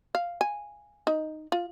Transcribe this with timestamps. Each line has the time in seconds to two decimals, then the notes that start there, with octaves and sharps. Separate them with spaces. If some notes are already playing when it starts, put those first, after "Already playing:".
0.15 F5
0.41 G#5
1.07 D#4
1.52 F4